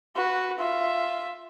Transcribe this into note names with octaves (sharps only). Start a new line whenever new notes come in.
F#4 B4
F4 E5